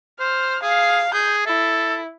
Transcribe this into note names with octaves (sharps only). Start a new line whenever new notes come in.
C5 F6
G#4 F5
G#4 G6
E4 A4